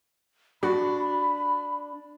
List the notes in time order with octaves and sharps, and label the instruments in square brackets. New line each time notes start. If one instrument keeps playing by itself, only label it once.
[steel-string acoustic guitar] D4 [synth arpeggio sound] F#4 [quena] B5